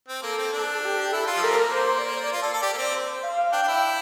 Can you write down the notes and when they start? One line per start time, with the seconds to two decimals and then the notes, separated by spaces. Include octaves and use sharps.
0.08 C4
0.22 A#3 A4
0.38 C4
0.53 D4
0.83 G4
1.12 E4 A4
1.27 F4
1.37 F3
1.42 G3 A#4
1.51 C4
1.58 A#3
1.73 C5
2.02 D5
2.33 F4
2.42 A4
2.53 A4
2.62 G4
2.73 A#3
2.78 C4
2.93 C5
3.23 F5
3.52 D4 G5
3.63 D4
3.68 E4